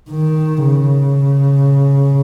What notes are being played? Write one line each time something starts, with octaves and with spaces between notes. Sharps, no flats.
D#3
C#3